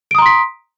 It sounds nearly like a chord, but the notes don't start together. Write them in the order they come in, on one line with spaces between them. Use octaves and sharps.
D7 D#6 A#5 C6 B6